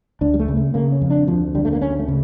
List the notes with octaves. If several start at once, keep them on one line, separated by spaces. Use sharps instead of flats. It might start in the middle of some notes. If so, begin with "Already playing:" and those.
D2 D4
G3
A3
C#3
A3
C#3 A#3
C#4
F2
D4
D2 F3
D3 G3
A3
A#3
D2 C#4
A3
C#3